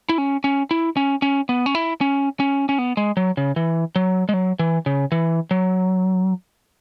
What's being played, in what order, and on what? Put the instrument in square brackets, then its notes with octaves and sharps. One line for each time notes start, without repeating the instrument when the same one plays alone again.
[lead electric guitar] E4
C#4
C#4
E4
C#4
C#4
B3
C#4
E4
C#4
C#4
C#4
B3
G#3
F#3
C#3
E3
F#3
G#3
F#3
E3
C#3
E3
F#3